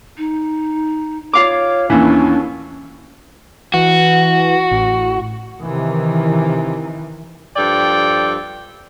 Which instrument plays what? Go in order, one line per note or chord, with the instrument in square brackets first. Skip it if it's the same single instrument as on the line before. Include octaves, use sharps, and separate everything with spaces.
[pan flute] D#4
[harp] F4 F5 D6 [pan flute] C#5
[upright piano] D#2 E3 [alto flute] C#4 [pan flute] D4 [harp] E4
[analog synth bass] E3 [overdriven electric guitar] F#4
[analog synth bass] A1
[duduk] C3 [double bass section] D#3 E3
[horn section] G2 F3 A4 D5 G5